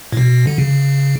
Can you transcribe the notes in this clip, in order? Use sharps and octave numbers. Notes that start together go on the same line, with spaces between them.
A2
B2
D3
C#3